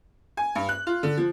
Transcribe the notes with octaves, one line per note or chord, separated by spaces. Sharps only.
G#5
G2
F#6
F4
D3
F3